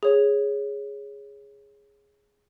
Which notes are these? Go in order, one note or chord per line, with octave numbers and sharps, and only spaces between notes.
G#4 C#5